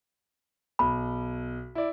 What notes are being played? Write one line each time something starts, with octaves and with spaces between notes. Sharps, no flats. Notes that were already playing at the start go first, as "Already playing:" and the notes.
B1 B5
E4 D5